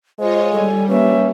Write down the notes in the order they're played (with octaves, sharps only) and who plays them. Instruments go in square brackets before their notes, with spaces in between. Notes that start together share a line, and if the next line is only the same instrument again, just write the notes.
[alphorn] G#3 [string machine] F4 C#5 D#5 [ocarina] C5
[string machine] G3 [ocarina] A4 [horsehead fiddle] G#5
[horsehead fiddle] A#3 E5 [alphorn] C#4 [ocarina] B4